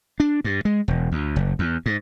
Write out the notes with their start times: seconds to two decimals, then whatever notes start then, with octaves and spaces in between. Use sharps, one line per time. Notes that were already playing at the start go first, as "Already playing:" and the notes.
0.20 D4
0.44 G2
0.65 G#3
0.88 E1
1.12 D2
1.36 F#1
1.59 E2
1.86 G#2